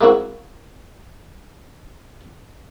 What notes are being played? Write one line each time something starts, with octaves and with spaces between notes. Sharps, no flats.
G#3 A#3 C4 E4 F#4